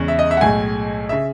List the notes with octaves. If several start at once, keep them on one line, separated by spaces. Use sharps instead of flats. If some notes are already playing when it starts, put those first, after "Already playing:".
Already playing: E2 C#3 G#3 C#4
E5
D#5
E5
F#5
B1 A2 G#3 G#5
C#3 E5